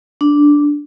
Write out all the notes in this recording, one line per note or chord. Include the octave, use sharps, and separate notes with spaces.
D4